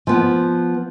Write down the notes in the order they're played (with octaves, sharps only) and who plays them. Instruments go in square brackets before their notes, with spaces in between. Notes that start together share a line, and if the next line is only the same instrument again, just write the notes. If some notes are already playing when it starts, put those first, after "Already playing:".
[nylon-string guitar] F3 B3